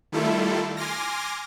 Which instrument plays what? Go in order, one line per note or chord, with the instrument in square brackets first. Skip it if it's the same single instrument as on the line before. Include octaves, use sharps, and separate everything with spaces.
[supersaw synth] D#3 G3 A3 E4 F4 A4
G#5 C6 D6 F6 A#6